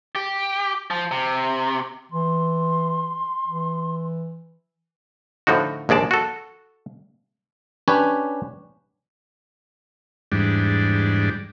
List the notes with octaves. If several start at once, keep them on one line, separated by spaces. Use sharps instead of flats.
G4
F3
C3
E3 C6
E3
A2 D3 F3 D#4 F#4
A#1 D#2 G#3 D5 A5
F#4 A4
C#4 D4 G4 B4 C#5
E2 G#2 G3 D4